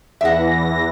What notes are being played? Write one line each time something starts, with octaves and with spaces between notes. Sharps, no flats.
E2 E3 E5 F#5 A#6